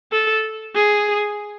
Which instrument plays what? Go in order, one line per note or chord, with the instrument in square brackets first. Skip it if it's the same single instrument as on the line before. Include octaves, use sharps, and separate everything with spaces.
[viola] A4
G#4